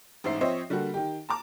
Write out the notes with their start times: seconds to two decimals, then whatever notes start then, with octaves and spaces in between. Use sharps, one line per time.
0.24 A1 G#2 C5 E5 C7
0.41 F3 C4 C5 C#5 D#5 E5
0.70 D3 G3 A#3 F#4 A4
0.94 D#3 G4
1.29 A5 A#5 D6